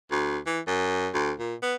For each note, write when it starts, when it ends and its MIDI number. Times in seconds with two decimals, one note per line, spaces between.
0.12 0.38 38
0.46 0.60 52
0.67 1.09 42
1.14 1.32 38
1.39 1.55 46
1.62 1.75 59